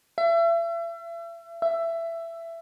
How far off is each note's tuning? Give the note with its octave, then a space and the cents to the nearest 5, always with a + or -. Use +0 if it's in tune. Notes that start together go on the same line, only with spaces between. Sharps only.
E5 +35
E5 +15